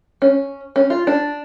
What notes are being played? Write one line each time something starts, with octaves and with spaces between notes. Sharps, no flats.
C#4
C#4
F4
D4